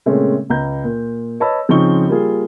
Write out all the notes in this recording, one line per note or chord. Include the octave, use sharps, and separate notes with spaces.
A#2 C#3 G#3 A3 C4 C#4
C#2 A#5 G6
A#2
B4 C#5 D#5 A5 B5 E6
C#3 F3 C4 D#4 C#6 G7
G3 A#3 F4 G#4